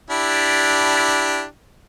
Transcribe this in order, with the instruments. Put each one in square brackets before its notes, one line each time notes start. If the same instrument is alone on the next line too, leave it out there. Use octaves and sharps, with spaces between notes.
[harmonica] D4 E4 G4